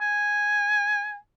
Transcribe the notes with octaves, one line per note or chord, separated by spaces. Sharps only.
G#5